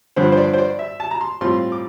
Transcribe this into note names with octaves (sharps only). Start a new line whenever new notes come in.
G2 D3 F3 C5
C5
D5
C5
D5
E5
A5
A#5
C6
A2 G3 C4 F4 C6
D6